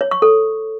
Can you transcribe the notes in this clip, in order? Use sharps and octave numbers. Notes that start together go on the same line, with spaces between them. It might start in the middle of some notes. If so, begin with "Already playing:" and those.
C#5
C#6
A4